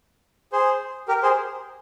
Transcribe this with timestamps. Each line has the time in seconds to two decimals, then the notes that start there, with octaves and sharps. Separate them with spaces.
0.52 G#4 C5
1.08 G4 A#4
1.23 G#4 C5